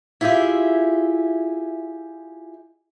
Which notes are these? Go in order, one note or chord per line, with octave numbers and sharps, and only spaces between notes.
E4 F4 G4 G#4 E5